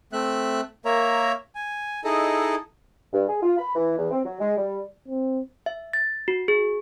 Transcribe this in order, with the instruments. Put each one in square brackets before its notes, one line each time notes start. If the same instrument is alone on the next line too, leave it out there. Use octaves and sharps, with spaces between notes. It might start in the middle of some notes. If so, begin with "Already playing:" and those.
[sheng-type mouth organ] A3 C4 E5 F#6
A#3 A#4 C#5 E5 A#5
G#5
D#4 E4 G#4 A4 D#5
[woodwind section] G2
G#4
F4
B5
E3
E2
C4
F#3
G#3
G3
[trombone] C4
[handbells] E5
A6
F#4
G#4